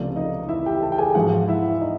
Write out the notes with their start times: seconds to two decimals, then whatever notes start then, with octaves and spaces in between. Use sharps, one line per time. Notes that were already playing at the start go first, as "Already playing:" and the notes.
Already playing: C#2 C3 F3 A3 D4 D5
0.16 D#4 D#5
0.49 E4 E5
0.66 G4 G5
0.82 A4 A5
0.92 G5
0.98 G#4 G#5
1.15 G#2 F3 G#3 F#4 F#5
1.47 E4 E5
1.81 D#4 D#5